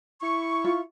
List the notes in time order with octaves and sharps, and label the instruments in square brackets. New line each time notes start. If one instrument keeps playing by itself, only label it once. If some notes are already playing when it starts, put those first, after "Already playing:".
[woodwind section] E4 C#6
[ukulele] F4